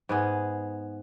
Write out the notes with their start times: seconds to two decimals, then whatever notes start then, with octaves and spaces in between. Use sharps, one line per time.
0.09 G#2 B3 G#4